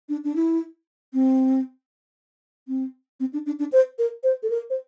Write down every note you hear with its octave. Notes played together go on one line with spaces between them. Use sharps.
D4
D4
E4
C4
C4
C4
D4
D4
D4
C5
A#4
C5
A4
A#4
C5